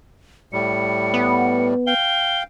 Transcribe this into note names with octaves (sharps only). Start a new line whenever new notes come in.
A2 G3 C#7
B3
F5 G5 G7